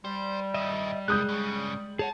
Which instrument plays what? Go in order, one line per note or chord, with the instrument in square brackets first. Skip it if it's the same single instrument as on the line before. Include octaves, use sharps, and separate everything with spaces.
[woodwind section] G3 [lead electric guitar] C5
[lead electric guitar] G2 D#3 [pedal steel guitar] D#5 E5
[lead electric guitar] C2 [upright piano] G#3 D#6 G6 [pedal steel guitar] F#6
[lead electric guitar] G2 C#3
[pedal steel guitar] G#4 C#5 F#5 [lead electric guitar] G5 A5